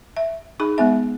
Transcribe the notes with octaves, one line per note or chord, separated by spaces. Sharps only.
E5
D#4 G#4 B5
G#3 B3 E5